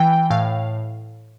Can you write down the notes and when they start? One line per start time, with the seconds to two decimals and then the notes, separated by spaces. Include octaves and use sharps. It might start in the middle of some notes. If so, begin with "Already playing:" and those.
Already playing: E3 G5
0.30 A2 F5